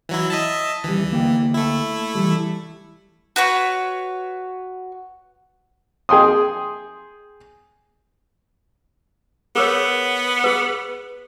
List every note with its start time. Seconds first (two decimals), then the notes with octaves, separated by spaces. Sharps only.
0.09 E3 F#3 E4
0.30 D#5 E5 A5
0.84 D#2 E3 G3
1.11 D2 A#3 G5
1.54 A3 E4
2.15 E3 G3
3.36 F#4 B4 C#5
6.09 G#4 G5 C6 D#6
9.56 B3 G#4 A#4 C#5
10.44 G#4 B4